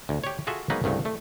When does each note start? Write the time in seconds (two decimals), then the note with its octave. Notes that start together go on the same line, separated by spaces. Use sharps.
0.09 D2
0.24 G4 C#5
0.47 F4 F#4 G#4 A4 E5
0.70 F#3 G#3 A#3 B3 D#4 B4
0.84 C2 G2 C#3 A3
1.05 A3